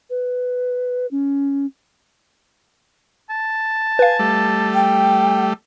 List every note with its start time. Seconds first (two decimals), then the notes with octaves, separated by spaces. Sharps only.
0.10 B4
1.11 C#4
3.30 A5
3.99 B4 F5 G#5
4.19 G3 A3
4.74 G5